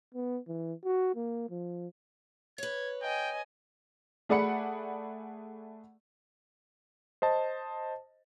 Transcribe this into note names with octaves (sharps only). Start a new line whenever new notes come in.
B3
E3
F#4
A#3
F3
B4 C#5 G#6
D#5 G5 G#5
A3 G#4 D5 F#5 B5 C#7
C5 D#5 A5